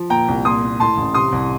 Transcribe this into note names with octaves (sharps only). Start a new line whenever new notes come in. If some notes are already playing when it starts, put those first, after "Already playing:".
Already playing: F3
A#2 G5 A#5
C2
A#2 C6 D#6
A#2
A2 A5 C6
A1
C3 C6 D#6
C2